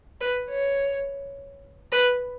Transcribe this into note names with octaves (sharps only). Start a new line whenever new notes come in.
B4
C#5
B4